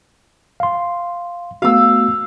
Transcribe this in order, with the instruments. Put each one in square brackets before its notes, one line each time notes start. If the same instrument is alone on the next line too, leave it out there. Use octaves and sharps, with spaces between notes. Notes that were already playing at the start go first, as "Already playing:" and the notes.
[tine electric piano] F5 C6
[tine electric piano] A3 B3 F#4 [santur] F5 E6